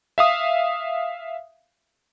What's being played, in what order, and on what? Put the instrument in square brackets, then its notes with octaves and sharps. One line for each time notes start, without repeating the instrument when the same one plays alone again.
[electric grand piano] E5 F5 D#6